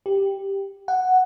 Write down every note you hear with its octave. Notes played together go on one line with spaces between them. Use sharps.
G4
F#5